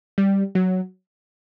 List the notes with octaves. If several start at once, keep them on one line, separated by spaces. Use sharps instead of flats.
G3
F#3